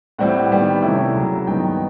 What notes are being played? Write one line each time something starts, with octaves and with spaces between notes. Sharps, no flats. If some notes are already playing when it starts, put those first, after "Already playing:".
A2 E3 G3 C4 E4 F#5
D#3 G3 B3
C3 E3 A3 C#4 E4
C#3 F#3 A#3
G2 D#3 F#3 B3 D#4 G5